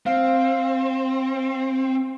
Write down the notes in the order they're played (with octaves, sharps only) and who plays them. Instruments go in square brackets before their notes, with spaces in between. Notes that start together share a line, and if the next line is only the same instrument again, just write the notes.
[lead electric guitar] C4 [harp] F5